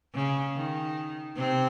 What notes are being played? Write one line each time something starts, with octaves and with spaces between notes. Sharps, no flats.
C#3
D#3
C3 C4